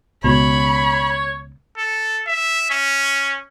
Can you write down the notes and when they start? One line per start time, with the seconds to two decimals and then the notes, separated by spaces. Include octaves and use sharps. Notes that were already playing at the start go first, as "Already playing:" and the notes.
0.24 C#2 B2 C#5 B5
1.78 A4
2.27 E5
2.70 C#4